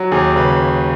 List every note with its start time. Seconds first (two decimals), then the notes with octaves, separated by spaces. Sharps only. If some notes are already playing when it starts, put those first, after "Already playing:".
Already playing: F#3
0.11 D#2 G#4
0.36 C#3 B4